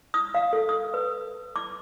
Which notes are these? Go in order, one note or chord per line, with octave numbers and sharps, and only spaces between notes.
D#6
F5
A4
D#6
B4
D6